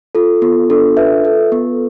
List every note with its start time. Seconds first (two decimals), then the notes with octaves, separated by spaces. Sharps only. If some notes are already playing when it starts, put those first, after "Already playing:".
0.15 F4 A4
0.42 B3 F4
0.70 D4 A4
0.97 B4 E5
1.25 A4
1.52 B3